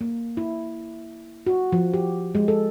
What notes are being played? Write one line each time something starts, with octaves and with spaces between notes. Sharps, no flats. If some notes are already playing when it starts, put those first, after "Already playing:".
A#3
E4
F#4
F3
G4
G#3
A4